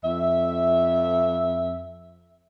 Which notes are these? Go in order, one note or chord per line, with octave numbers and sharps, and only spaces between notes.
F2 E5